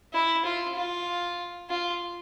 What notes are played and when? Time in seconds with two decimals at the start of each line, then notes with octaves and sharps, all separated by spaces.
0.14 E4
0.45 F4
0.76 F4
1.70 F4